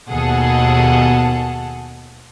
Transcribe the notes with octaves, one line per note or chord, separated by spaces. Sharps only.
D#2 B2 G#4 A4 F#5 A5